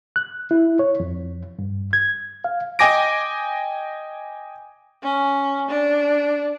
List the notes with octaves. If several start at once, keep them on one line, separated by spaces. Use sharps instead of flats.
F#6
E4
C#5
F2
G2
G#6
F5
D#5 G5 G#5 D6 A#6 D7
C#4
D4